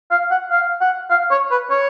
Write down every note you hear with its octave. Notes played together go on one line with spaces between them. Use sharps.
F5
F#5
F5
F#5
F5
C#5
B4
C#5